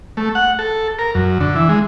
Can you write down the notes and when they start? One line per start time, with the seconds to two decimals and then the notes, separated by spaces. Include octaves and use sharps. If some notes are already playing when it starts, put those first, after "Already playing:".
0.17 A3
0.35 F#5
0.59 A4
0.99 A#4
1.15 F#2
1.41 D3
1.55 E3
1.69 G#3